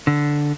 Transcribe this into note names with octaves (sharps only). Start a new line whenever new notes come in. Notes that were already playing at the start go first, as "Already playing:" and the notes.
D3